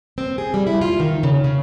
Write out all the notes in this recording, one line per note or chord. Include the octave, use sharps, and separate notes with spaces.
C4
G#4
G3
E4
F4
D#3
C#3
C#3